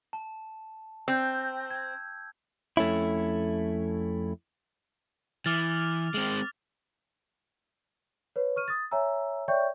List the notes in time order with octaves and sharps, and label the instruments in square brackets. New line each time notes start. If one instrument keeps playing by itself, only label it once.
[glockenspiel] A5
[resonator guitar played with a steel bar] C4 [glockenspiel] E6 G6
[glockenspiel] G#6
[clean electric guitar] F2 A3 C#4 E4
[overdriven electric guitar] E3 [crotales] D6 F6 A6
[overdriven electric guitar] G#3 C4
[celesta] B4 C#5
C#6 F6 D#7
D#6 A6
C#5 E5 G#5 A#5 E6
C#5 D5 E5 G5 C#6 G6